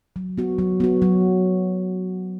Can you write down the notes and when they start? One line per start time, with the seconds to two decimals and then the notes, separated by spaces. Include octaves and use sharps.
0.16 F#3
0.38 B3 F#4
0.58 F#3
0.80 B3 F#4
1.02 F#3